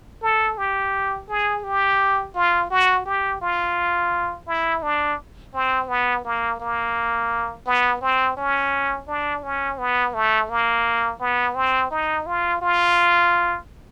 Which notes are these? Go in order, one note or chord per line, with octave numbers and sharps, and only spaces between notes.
A4
G4
G#4
G4
F4
F#4
G4
F4
E4
D4
C4
B3
A#3
A#3
B3
C4
C#4
D4
C#4
B3
A3
A#3
B3
C4
D#4
F4
F4